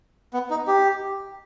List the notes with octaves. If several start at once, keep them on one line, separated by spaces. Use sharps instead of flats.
B3
D#4
G4